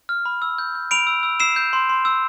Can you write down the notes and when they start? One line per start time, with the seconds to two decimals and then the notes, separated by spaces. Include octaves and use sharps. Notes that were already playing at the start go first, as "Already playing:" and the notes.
0.09 F6
0.26 B5
0.42 E6
0.58 G6
0.75 G6
0.91 B5 D7 F7
1.07 E6
1.23 E6
1.40 E6 C7 E7
1.56 G6
1.73 C6
1.89 C6
2.05 E6